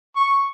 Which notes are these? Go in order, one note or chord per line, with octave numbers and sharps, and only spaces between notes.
C#6